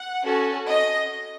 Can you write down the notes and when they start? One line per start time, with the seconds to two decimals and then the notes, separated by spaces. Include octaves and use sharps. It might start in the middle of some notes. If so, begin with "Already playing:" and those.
Already playing: F#5
0.23 C#4 F#4 A4
0.67 D#5